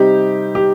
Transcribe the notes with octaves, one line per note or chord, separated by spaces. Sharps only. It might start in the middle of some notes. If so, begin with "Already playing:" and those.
Already playing: C3 G3 C4 D#4 G4
G4